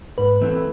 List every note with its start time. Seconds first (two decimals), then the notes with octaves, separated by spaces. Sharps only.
0.18 G#2 B4
0.41 E3 A3 C4